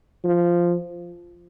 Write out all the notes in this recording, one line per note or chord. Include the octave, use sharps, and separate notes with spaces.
F3